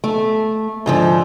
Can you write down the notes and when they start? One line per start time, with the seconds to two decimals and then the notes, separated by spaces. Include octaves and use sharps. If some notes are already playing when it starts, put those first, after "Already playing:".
0.04 A3
0.86 G#2 D3 F3